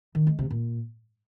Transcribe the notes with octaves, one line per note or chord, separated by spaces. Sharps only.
D#3
G#3
C3
A#2